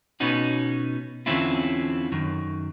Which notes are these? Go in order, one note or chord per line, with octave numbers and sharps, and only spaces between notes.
B2 B3 C#4 D#4 F#4
E2 D3 C4 C#4 E4 F4
F#2 D#3